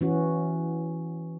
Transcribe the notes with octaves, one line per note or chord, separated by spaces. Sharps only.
E3 C#4 F#4